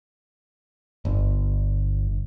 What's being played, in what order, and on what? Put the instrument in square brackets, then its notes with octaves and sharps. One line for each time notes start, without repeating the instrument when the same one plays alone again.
[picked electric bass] G1